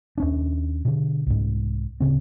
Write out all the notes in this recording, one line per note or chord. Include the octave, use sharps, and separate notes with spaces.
D#2 C#4 D4
B2 D3
C2 G#2
D1 G#1 C#3 C4